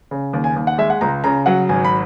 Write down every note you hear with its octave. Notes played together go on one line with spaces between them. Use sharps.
C#3
D#2
G#5
D#2
F#5
G#3 E5
F#5
C#2 A#5
C#3 A#5
F#3 F#5
G#1 G#5
B5